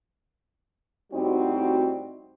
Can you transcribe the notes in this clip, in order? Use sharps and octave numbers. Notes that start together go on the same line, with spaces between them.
A2 G3 C4 D#4 F#4